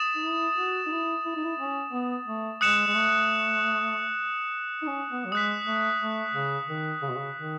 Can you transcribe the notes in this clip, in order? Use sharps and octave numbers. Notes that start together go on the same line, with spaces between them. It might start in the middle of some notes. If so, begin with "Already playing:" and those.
Already playing: D#6 A6 E7
D#4
E4
F#4
D#4
E4
E4
D#4
E4
C#4
B3
A3
G#3 D#6 F#6 C#7 E7
G#3
A3
D#4
C#4
B3
F#3
G#3 D#6 F#6 B6
A3
A3
C#3
D#3
C#3
B2
C#3
D#3